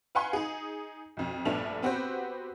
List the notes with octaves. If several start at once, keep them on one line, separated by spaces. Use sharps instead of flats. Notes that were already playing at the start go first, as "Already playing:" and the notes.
B4 F5 F#5 G#5 B5 C6
D#4 G#4
B1 F2
A#1 G2 A3 B3 D4 F7
B3 C4 F#4 G4 B4 C5